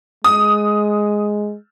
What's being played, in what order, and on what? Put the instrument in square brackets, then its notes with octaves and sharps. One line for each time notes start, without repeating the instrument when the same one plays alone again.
[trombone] G#3 [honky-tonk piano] D#6